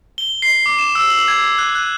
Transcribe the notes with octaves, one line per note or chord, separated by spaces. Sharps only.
G7
C7
D6
E7
E6
F#7
G#6
F#6
F#6